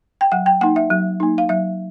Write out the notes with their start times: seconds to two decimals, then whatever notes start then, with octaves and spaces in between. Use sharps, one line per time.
0.21 G5
0.32 F#3 F#5
0.46 G5
0.61 A#3 D#4 F#5
0.76 E5
0.90 F#3
1.20 A#3 D#4
1.38 F5
1.49 F#3 E5